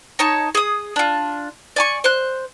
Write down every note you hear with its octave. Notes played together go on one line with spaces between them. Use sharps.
D#4 C#5 A5
G#4 D#6
D4 F4
D5 G#5 C#6
C5 F#6